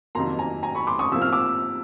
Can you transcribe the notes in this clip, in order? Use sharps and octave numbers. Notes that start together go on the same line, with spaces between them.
F2 C3 D#3 F#3 A#3 A#5 C6
G#5 A#5
G#5 A#5
B5 C#6
C6 D6
C#6 D#6
C3 F3 A#3 E6
F6
D6 E6